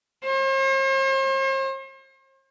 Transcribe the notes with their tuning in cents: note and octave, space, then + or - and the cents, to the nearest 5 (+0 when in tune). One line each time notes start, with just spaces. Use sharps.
C5 +45